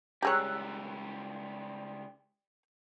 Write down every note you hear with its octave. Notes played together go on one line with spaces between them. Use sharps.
C#2 G3 G4 G#4 C#5 A#5 E6 F#6